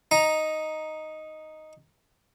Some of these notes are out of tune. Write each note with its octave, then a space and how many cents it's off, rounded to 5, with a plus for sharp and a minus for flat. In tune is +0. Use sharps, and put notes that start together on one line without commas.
D#4 +0 A#5 +0